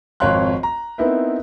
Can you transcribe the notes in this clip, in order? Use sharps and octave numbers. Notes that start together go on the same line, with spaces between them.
G#1 F2 C#5 F5 C6 F#6
A#5
B3 C4 D#4 E4 A#4 B4